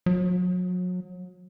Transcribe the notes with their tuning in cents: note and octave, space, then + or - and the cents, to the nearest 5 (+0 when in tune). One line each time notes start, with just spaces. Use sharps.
F#3 -35